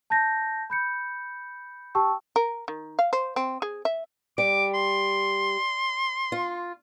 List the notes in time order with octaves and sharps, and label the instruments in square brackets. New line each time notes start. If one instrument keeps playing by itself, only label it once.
[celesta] A5 G6 A#6
B5 G6 C#7
G4 G5 A5 C#6 E6
[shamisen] A#4
D#3
F5
C5
C4
G#4
E5
[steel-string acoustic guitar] G3 [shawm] D6
[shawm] C6
[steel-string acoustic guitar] F4